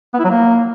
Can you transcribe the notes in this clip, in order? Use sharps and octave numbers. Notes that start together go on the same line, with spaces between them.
B3
E4
F#3
A#3